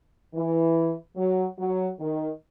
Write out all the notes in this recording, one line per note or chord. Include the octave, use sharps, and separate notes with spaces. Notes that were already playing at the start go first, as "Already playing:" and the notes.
E3
F#3
F#3
D#3